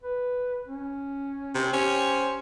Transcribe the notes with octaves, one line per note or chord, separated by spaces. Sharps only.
B4
C#4
C3
C#4 G4 C5